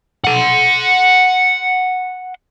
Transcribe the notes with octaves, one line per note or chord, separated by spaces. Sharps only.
F#5 C6